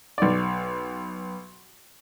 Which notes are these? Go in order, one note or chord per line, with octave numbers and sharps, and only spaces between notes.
B1 D5